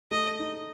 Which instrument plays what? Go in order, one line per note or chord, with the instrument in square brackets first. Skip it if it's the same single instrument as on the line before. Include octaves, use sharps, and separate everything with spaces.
[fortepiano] A3 [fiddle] D#5
[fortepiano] D#4